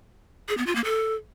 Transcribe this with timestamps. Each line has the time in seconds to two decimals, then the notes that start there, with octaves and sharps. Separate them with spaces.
0.49 G#4
0.58 B3
0.66 F4
0.75 A#3
0.84 A4